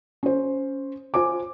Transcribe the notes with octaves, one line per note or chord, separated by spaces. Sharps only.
C#4 C5
F4 C5 G#5 D6